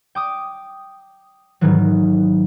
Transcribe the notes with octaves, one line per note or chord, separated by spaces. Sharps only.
G5 D6 D#6
G#2 D#3 E3 F#3